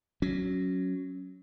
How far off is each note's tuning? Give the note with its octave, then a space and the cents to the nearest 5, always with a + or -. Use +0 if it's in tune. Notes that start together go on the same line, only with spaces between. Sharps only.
F#3 +0 C#4 +0